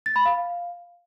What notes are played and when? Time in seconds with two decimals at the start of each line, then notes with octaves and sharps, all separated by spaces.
0.06 A6
0.16 B5
0.25 F5